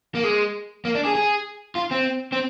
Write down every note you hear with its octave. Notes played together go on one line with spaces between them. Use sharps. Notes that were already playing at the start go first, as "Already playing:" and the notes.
A#3
G#3
A#3
D4
G#4
G#4
F4
C4
C4